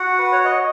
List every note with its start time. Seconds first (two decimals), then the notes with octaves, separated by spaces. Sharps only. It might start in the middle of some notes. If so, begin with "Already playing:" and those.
Already playing: F#4 F#5
0.19 B4
0.32 C#5
0.45 D#5